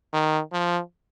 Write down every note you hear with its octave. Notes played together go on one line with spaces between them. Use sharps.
D#3
F3